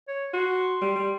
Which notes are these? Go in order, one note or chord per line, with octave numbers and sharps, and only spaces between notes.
C#5
F#4 C6
G3
G3